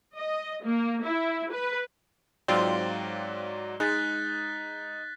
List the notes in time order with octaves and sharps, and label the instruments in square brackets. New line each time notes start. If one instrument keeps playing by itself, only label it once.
[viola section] D#5
A#3
E4
B4
[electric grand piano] G#2 F#3 D5 [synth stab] C4 F4 [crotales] G7
[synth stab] G#3 [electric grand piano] D#4 [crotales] F#6 A6 B6